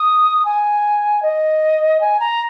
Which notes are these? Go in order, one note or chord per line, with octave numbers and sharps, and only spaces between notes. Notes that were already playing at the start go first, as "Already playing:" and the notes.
Already playing: D#6
G#5
D#5
G#5
A#5